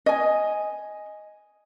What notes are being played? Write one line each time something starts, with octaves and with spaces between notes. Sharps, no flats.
D#5 G#5